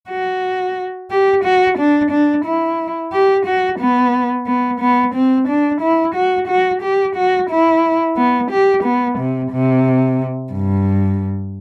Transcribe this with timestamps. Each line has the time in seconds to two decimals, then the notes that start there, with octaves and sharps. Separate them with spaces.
0.10 F#4
1.11 G4
1.44 F#4
1.78 D4
2.11 D4
2.45 E4
3.13 G4
3.46 F#4
3.80 B3
4.47 B3
4.80 B3
5.14 C4
5.49 D4
5.81 E4
6.15 F#4
6.48 F#4
6.82 G4
7.16 F#4
7.50 E4
8.17 B3
8.51 G4
8.84 B3
9.19 C3
9.52 C3
10.53 G2